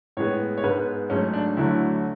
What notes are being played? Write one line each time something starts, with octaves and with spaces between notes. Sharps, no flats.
A2 G#3 B3 C#5
C#5
G#2 G#3 B3 B4
G#2 F#3 A3 C#4
D4
D2 D3 F#3 A3 E4